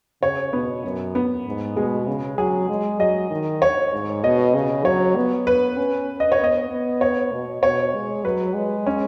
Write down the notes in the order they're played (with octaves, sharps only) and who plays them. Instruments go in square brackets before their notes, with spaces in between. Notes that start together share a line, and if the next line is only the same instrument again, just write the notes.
[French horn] C#3 [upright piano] C#5
[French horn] B2 [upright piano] B3
[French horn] F#2
[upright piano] B3
[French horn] G#2
[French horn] B2 [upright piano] G#3
[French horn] C#3
[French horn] F#3 [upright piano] G#4
[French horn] G#3
[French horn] F#3 [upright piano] D#5
[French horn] D#3
[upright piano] C#5
[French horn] G#2
[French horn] B2 [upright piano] D#5
[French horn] C#3
[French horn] F#3 [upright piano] C#5
[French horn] B3
[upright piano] B4
[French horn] C#4
[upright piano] D#5
C#5
[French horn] B3 [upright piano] D#5
[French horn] B3
[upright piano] C#5
[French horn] B2
[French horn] B2 [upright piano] C#5
[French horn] G#3
[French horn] F#3 [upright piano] B4
[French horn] G#3
[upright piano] C#4